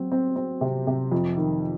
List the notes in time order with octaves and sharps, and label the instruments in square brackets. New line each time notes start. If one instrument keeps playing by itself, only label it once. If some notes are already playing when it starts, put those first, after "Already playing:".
Already playing: [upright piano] F#3 C4
C4
C4
C3
C3
F2
D#3